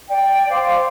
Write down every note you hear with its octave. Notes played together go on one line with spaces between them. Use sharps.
D5 G5
C5 D5 F5 D6